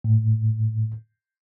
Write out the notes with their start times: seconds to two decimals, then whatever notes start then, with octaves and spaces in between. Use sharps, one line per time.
0.04 A2